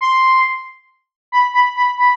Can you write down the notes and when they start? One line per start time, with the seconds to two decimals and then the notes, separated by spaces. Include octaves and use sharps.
0.01 C6
1.32 B5
1.54 B5
1.76 B5
1.98 B5